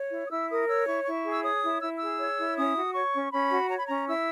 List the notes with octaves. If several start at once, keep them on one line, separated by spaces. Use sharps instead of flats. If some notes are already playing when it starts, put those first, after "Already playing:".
Already playing: C#5
E4
D#6
E4 E6
A#4 D#6
C#5 E6
E4 C#6
E4 C#6
G#4
E6
C#5 D#6
E4
E4 E6
G#4 E6
C#5
E4
C#4 D#6
F#4
C#5 C#6
C#4
C#4 B5
F#4
C#5 A#5
B5
C#4 A#5
E4 E6